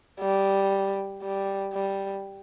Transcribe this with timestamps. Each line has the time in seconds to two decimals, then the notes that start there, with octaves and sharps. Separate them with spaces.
0.20 G3
1.22 G3
1.73 G3